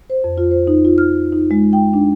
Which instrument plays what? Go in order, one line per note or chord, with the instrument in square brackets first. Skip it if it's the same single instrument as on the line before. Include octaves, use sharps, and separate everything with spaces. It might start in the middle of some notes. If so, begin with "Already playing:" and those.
[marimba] C5
F2
F4
C5
D#4
F4
F6
D#4
G#3
G5
D4